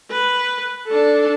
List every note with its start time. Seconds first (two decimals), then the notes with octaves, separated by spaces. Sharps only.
0.11 B4
0.87 D4 A4